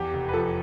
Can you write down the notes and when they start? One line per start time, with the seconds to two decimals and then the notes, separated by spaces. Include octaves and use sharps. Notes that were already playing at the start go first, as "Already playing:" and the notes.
Already playing: E2 G4
0.13 F1
0.29 B4
0.33 F3 A4